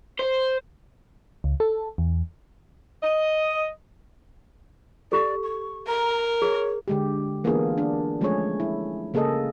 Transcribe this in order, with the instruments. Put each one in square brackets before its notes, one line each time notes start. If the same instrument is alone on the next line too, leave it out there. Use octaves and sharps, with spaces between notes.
[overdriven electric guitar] C5
[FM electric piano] C#2
A4
E2
[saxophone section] D#5
[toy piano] G4 A4 [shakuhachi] D5
[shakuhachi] C#6
[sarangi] A#4 [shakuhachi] A#5
[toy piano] G#4 [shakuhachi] C#5
[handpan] D3 G#3 G4
E3 A#3 B3 D4 F4 G#4
D4
F3 G#3 A3 C#4 G#4 C#5
E4
C#3 A#3 G#4 A4 D#5